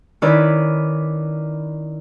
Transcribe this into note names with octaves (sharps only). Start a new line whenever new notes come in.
D#3 C#4 E4 B4 D5